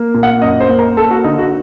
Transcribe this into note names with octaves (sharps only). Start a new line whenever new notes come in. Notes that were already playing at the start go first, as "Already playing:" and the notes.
Already playing: A#3
A#2
F#5
F#2 D#5
C5
A#3
A#4
A#3 A4
F#4
D3 D#4
F#4